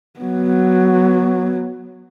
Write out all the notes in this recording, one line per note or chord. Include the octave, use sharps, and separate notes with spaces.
F#3 B3